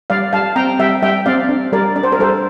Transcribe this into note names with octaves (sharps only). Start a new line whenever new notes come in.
G3 D5 F5
G3 F5 A5
C4 G5 A#5
G3 E5 G5
G3 E5 G5
C4 D5 F5
D4
G3 A#4 D5
D4 D5
C5
A#4
G3 A4 C5